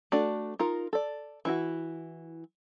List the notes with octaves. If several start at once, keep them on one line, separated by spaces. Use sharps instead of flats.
A3 D4 F#4 D5
D#4 F4 A#4
A4 D5
E3 E4 F#4